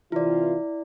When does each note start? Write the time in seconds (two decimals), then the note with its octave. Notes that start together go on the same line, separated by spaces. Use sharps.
0.12 C3 E3 E4 F4 D5